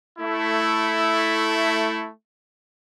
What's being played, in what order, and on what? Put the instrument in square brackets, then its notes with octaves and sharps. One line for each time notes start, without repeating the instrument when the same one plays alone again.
[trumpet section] A3 E4